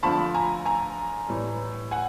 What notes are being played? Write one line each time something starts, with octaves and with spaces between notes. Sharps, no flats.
D3 F3 A3 A5 B5
G#5 A#5
G#5 A#5
A2 E3 G3
F#5 G#5